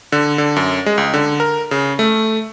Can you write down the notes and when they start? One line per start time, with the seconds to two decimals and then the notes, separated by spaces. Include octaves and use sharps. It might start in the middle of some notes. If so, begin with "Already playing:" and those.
0.12 D3
0.38 D3
0.56 F#2
0.86 G#3
0.98 C#2
1.14 D3
1.40 A#4
1.71 C#3
1.99 A3